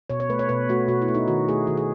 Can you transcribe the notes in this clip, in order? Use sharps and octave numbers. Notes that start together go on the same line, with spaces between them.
B2 C#5
C#5
A3 B4
C#5
B2 B4
A3 F#4
B2 F#4
E4
A3
D#4
D#3 F#4
A3 G#4
D#3 F#4
G#4